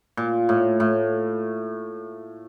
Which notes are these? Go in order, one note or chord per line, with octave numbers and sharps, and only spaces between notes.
A#2
A2
A2